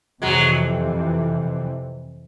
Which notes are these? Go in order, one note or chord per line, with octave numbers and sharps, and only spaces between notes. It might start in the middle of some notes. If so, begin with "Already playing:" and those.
F2 C3 E3 F#3 G#3